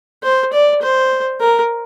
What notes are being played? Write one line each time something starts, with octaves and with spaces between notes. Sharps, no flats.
C5
D5
C5
A#4